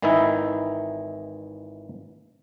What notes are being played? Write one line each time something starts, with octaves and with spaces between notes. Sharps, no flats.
G#1 D#3 E3 D#4 E4 E5